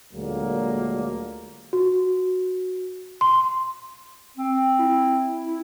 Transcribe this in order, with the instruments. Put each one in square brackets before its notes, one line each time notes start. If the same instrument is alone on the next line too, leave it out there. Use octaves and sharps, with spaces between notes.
[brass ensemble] D2 A#2 D3 F#3 G#3 A#3
[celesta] F#4
C6
[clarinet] C4
[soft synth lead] E4